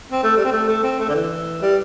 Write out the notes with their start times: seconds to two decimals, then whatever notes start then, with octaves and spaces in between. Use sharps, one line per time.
0.12 C4
0.23 A3
0.37 G3
0.45 C4
0.52 A3
0.68 A3
0.83 C4
0.99 A3
1.09 D3
1.15 E3
1.62 G3